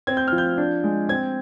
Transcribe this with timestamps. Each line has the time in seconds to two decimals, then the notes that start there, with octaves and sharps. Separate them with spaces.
0.07 C4 G#6
0.17 G6
0.28 F3 F6
0.38 G6
0.58 D4
0.84 G#3
1.09 C4 G#6